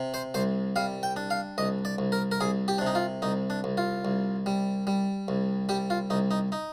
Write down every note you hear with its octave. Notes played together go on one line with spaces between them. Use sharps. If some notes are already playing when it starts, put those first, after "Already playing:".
Already playing: C3
C5
C2 C5
G3 F5
G5
D4
F5
C2 D#5
D5
C2
A#4
A#4
C2 G#4
G4
C3 D4
D#4
F4
C2 D#4
D4
C2
F4
C2
G3
G3
C2
G3 G4
F4
C2 D#4
D#4
D#4